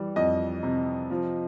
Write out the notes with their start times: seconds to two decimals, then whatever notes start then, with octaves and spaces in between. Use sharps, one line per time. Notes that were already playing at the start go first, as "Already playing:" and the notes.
Already playing: E3 G3
0.16 F2 D#5
0.63 C3
1.10 F3